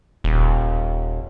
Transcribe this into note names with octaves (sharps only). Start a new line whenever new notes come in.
D#1